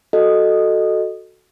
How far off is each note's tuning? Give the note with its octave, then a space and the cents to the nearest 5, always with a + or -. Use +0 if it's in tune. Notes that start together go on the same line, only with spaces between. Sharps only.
F#4 +0 A4 +0 D#5 -10